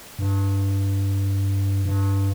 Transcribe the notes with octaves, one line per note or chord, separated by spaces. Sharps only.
G2
G2